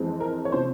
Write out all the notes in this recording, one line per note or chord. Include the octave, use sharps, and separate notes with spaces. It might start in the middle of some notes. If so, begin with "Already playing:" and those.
Already playing: F2 E3 G#3 C4
A#4
C#5
C3 F3 C5